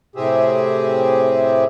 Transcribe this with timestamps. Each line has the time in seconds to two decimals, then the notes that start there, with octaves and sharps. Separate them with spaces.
0.16 A2 C3 C4 G4 G#4 E5